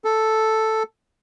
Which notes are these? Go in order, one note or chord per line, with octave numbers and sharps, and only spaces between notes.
A4